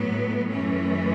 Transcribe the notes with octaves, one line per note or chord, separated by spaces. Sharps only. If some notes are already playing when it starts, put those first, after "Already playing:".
Already playing: A2 F#3 B3
F#2 E3 A3 C#4